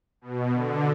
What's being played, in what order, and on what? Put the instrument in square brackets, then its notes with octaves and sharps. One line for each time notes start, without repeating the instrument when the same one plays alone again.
[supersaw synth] B2
D3